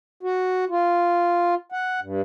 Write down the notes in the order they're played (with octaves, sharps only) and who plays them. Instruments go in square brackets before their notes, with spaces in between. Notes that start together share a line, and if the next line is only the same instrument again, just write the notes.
[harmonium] F#4
F4
F#5
G2